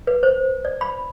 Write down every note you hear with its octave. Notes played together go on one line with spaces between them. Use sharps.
B4
C5
D5
B5